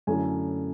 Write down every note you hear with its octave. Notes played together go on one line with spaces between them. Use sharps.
F#2 D3 A3 C#4 E4 G#5